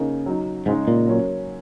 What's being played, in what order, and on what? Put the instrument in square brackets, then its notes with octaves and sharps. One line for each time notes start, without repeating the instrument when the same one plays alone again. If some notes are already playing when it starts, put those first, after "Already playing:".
Already playing: [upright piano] C#3 A#3 D#4
F#3 D#4
[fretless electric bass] G#2 [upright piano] C#3 G#3 D#4
[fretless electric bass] A#2
[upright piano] F#3 A#3 C#4